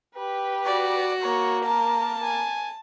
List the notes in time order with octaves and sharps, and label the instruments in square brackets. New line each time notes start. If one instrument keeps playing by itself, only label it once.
[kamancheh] G4 B4
[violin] F#4 [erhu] D5
[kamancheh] A#3 [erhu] C#5
[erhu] A#4 [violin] A5
[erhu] G#5